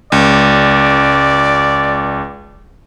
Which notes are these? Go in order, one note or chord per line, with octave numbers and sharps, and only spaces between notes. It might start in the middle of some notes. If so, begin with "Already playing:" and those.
C#2 D5